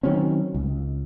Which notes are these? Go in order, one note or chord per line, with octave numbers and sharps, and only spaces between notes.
D#3 F#3 C4 C#4
C#2